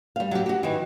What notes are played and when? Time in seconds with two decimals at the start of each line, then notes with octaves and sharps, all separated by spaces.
0.16 G3 F5
0.31 F#3 G4
0.46 F#4 G4
0.63 D#3 E3